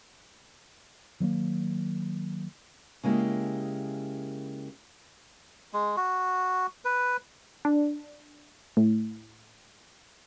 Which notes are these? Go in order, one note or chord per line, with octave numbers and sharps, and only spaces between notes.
D#3 F#3 G3 A#3
C#3 G#3 A#3 E4 G4
G#3
F#4
B4
D4
A2